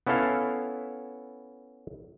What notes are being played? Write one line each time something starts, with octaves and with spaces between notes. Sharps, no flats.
B3 C#4 E4 A4 F5